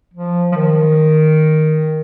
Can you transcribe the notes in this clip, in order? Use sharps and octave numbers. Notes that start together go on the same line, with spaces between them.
F3
F3
D#3